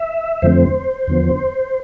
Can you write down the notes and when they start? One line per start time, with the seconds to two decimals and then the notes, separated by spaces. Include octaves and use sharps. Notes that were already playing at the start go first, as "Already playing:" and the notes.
Already playing: E5
0.42 F2 D3 F3 A3 C4 C5
1.07 E2 D3 F3 B3